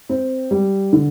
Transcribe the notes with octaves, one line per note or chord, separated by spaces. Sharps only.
C4
G3
D3